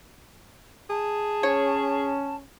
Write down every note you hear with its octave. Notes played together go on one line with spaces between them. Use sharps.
G#4 A5
C#4 C#5